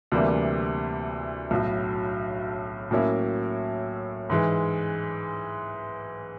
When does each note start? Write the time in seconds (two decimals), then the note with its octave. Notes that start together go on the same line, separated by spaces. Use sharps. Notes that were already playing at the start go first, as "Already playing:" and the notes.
0.12 D2 C3 E3 G3 A#3
1.51 B1 A2 F#3
2.91 A2 F#3 A#3 C#4 E4
4.30 G#2 E3 G#3